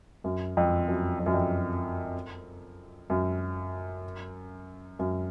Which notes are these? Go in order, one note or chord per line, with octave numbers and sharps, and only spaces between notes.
F#2
F2
F#2
F2
F#2
F2
F#2
F#2